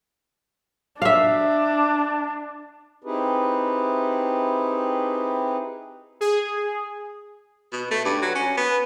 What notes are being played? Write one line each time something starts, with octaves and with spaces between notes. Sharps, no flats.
D4 E5 F5
C4 D#4 E4 G4 G#4 B4
G#4
B2
A3
G2
F#3
C#4
B3